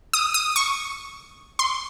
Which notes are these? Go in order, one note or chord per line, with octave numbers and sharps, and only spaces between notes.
D#6
D#6
C#6
C6